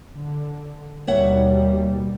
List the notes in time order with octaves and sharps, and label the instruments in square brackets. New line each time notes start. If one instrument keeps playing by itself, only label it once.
[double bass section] D3
[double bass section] D#2 B2 G3 [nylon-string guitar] C#5 E5 F#5